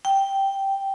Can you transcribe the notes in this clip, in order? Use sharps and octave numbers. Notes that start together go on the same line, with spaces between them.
G5